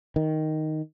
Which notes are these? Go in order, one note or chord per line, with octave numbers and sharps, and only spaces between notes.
D#3